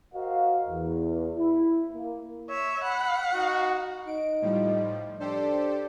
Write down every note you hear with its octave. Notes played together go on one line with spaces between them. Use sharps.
F#4 A#4 C5 D#5 F5
E2
E4
A#3
C#5 E5
F#5 B5
D#4 F#4
D#4 D7
A2 F3 G3
D4 G4 A4 C5